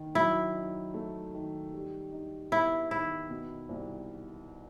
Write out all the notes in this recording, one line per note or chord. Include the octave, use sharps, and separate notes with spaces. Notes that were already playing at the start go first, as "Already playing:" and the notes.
Already playing: D#3
F#3 E4
D#4
A3
D#3
G3
D#4
B3 E4
D#3 E4
B2
C2